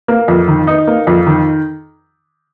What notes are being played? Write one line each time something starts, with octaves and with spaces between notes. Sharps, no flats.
A#3
F2
D#3
D#4
A#3
F2
D#3